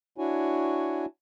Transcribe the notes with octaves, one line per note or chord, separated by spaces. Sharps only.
D4 E4 F#4 C#5 G#5